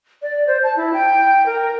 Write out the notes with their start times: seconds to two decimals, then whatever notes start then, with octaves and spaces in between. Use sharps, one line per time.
0.22 D5
0.47 C5
0.63 A5
0.76 E4
0.94 G5
1.46 A#4